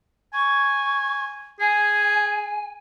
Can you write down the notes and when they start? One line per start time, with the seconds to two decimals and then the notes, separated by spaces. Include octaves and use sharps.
0.34 G#5 C#6
1.60 G#4 G#5